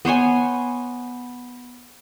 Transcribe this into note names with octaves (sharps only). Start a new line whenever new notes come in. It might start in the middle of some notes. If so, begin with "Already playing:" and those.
B3 C5 C#5 G#5